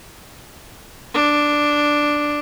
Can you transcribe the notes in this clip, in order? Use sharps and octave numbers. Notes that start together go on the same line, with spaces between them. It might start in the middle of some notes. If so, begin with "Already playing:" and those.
D4